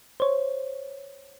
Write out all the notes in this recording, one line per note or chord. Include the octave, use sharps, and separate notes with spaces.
C5 C#5